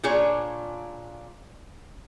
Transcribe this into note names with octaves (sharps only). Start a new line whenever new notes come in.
A#2 D4 F4 G#4 C#5